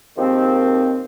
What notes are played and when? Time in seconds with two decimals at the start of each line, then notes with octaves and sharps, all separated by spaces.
0.17 D#2 G#2 D#3 F3 C4